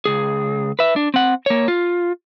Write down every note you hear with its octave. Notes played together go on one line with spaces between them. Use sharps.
C#2 G#4
B4 E5
D4
C4 F#5
A#3 C#5
F4